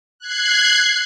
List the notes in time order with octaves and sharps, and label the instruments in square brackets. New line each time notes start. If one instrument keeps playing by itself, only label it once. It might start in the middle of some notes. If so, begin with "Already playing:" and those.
[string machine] F#6 G#6 C7